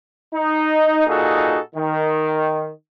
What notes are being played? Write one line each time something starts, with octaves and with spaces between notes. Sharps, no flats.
D#4
A#2 D#4 F#4 G#4 A4
D#3